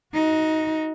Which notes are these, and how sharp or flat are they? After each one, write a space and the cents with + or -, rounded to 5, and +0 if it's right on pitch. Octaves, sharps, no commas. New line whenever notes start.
D#4 +15 F#4 +0